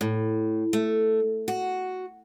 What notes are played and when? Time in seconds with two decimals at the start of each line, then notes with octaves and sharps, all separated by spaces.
0.01 A2
0.73 A3
1.48 F#4